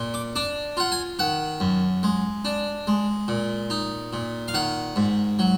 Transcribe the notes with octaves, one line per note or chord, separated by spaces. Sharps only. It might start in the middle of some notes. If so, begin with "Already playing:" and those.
Already playing: A#2
D6
D4 D6
F4 F#5
G#5
D#3 F#5
F#2
G#3
D4
G#3
A#2
D#4
A#2
F5
D#3 F#5
G#2
F#3